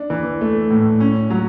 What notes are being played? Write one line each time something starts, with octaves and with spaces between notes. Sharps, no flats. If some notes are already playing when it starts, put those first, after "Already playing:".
Already playing: D4
E3
A3
A2
C#4
F#3